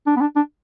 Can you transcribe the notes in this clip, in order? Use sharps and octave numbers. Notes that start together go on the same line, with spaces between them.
D4
B3
D4
D4